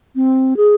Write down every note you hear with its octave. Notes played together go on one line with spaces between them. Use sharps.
C4
G#4